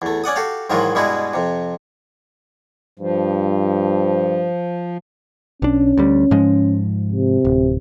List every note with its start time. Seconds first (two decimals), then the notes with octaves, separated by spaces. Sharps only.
0.02 E2 A3
0.24 C#4 D5 F#5 D#6
0.36 F#4 G4 A4 F5
0.70 G#2 D#3 E3 F#3 F4 F#4
0.95 G2 B2 G3 G#3 E4 F#4
1.34 F2 C3
2.99 G2 F3
5.62 B1 C#4 D4
5.98 D2 G3
6.31 G#2 F3 G#3
7.12 C3
7.45 D1